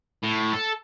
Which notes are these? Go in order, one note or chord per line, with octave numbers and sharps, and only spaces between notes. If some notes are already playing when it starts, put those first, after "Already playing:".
A2
A4